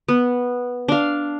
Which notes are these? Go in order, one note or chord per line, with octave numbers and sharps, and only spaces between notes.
B3
D4 F5